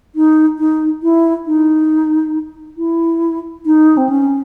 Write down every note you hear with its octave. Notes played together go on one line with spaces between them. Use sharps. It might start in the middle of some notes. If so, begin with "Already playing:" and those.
D#4
D#4
E4
D#4
E4
D#4
C4
C#4